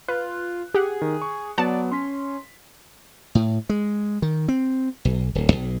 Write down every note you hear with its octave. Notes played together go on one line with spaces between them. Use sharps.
F4 B4 F#6
G4 G#4 F#5
D#3
C#6
F#3 B3 B4 D5 F#5 A5
C#4 C6 B6
A2
G#3
D#3
C4
B1
D1
B1